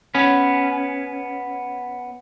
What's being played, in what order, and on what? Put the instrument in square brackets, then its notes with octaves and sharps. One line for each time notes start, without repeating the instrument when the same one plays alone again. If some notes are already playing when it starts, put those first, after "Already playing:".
[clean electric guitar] B3 C#4